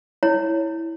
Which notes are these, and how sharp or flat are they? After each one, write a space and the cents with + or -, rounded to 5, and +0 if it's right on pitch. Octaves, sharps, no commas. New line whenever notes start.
E4 -10 C#5 +0